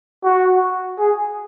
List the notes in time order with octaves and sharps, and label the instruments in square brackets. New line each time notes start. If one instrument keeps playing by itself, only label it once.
[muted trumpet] F#4
G#4